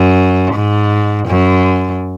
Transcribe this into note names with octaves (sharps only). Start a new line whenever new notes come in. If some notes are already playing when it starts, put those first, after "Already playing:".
Already playing: F#2
G#2
F#2